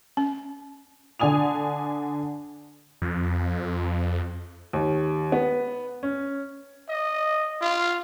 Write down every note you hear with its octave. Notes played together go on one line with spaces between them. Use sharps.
C#4
D3 D4 G#5 D#6 F7
F2
D#2
B3
C#4
D#5
F4